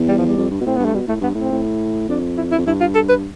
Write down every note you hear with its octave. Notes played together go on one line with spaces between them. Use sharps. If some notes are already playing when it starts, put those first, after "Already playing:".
Already playing: E2
G3
F3
G3
F2
G2
B2
A2 C4
G2 B3
A3
B2 G3
A2 A3
G2 B3
A2 C4
A2
F2 D4
E4
E4
F2
G2 E4
F4
A4
B4